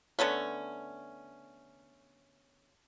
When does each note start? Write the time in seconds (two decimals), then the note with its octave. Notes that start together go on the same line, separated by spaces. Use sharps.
0.19 D3 A3 B3 C#4